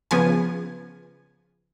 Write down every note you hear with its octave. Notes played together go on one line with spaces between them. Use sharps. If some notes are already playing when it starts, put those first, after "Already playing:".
C#3 F3 B3 G#5